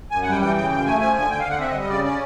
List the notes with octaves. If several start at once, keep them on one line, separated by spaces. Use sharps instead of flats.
F#2 G#5
F#5
G3 G5
E3 G5
C#3 G5
F#2 G5
A3 G#5
F3 G#5
D3 G#5
D3 G5
F5
D3
F#5
C4 E5
D#5
G3
D#5
C#3 D5
C#4 D5